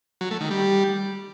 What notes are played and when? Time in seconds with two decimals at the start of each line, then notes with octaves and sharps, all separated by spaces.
0.21 F#3
0.31 A3
0.41 D#3
0.51 G3